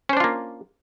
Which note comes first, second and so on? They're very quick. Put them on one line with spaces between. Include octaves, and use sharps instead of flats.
C#4 C5 D4 F4 A#3